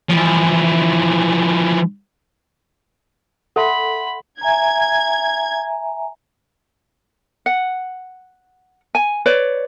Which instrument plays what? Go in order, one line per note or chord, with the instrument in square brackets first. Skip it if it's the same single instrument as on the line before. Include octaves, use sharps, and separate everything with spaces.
[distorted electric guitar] E3 F3
[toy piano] A4 E5 A5 [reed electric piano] F#5 C6 [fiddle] B5
[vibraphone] E5 G#5 A#5 [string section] G#6
[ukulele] F#5
G#5
B4 C#5 D5